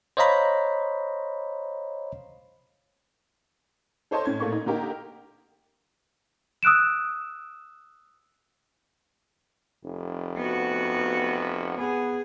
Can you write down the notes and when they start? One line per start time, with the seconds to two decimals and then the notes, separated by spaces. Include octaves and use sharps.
0.17 C5 C#5 D#5 F5 A#5 B5
4.11 A4 C5 C#5 D#5 A5 C6
4.25 A2 C#4 G#6
4.40 A#2 A3 A#3 C#6
4.52 D#4
4.66 D3 A#3 D#4 G4 A#4
6.63 D#6 E6 F#6 D7 E7
9.84 F1
10.37 B3 F#4
11.78 B3 G#4